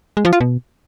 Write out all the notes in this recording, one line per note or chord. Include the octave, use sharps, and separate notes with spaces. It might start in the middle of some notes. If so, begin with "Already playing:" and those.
G#3
F3
F4
B2